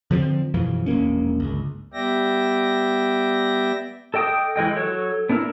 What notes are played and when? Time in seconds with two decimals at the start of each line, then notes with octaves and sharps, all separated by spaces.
0.11 D3 F3 G#3 C4
0.54 F#2 B2 E3 F3
0.86 E1 A#1 A#3 C#4
1.40 G1 C#2
1.93 G3 B3 D5 E5 G5 A#6
4.14 A4 D#5 G5 D6 D#6
4.56 E3 G#3 D#5 G5
4.76 F#3 A4 C#5
5.30 B3 D4 E4 A#4